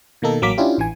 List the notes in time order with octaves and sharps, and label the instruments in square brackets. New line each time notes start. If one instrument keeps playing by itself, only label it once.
[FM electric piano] B2 D#3 A#3 D#4 A4
A1 F#3 A#3 A#4 D6 B6
C#4 D4 E4 F4 G4
A1 E3 G#5